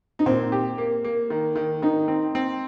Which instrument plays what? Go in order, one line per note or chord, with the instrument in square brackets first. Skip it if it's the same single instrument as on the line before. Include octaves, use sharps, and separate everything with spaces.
[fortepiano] D#4
[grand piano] A#2 [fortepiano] C4
[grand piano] G4
A#3
A#3
D#3
D#3
[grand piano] D#3 [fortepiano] D#4
[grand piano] C4
C4